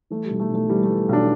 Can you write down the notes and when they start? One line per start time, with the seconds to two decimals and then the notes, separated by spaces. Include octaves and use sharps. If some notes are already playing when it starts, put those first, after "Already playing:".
0.10 E3 A3
0.25 G3
0.30 B1
0.40 A3
0.50 B1
0.55 A3
0.69 E3 G3
0.83 A3
0.89 E3
1.09 B1 D4